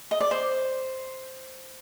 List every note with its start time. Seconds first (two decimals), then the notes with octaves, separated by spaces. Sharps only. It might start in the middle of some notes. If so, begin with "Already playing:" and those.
0.11 D#5
0.21 D5
0.31 C5